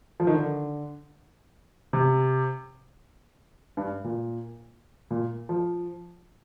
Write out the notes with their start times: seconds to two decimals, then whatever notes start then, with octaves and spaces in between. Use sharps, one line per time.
0.20 F3
0.27 D#3
0.34 D3
1.93 C3
3.77 G2
4.04 A#2
5.11 A#2
5.49 F3